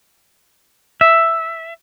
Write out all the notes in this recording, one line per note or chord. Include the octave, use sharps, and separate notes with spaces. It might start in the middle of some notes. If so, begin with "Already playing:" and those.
E5